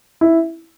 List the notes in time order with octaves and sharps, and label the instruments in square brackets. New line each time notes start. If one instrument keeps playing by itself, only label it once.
[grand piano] E4